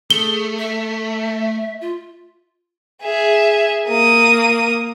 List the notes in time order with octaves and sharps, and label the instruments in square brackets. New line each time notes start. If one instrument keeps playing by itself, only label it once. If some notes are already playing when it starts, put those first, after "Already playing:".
[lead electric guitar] A3 [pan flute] G#4 [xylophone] G7
[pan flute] E5
F4
[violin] G#4 E5
A#3 D#6